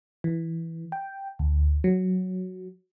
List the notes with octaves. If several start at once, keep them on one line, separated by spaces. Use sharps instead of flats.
E3
G5
D2
F#3